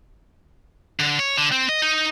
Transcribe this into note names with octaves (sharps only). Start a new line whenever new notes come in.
D3
C#5
D3
C4
D#5
D#4